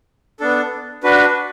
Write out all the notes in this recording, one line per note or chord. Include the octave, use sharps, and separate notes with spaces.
B3 D4 A4
D4 F#4 B4